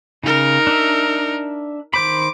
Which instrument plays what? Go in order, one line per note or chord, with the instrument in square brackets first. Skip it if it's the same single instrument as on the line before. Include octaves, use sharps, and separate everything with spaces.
[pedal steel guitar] C#3 [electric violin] D#4 A#4
[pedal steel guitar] D4 E5
[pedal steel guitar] D#3 C5 B5 [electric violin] D6